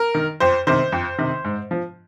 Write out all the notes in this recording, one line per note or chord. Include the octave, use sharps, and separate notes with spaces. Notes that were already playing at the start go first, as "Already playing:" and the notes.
Already playing: A#4
D#3
F2 C5
C3 D#3 C5
F2
C3 D#3
G#2
F3